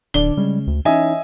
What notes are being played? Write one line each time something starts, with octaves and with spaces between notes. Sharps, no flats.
D1 D3 D4 D5 G7
C#3 G3 G#3
D2
E3 C#4 D#4 D#5 E5 G#5